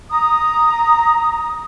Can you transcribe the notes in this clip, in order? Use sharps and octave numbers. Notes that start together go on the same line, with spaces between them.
A#5 D#6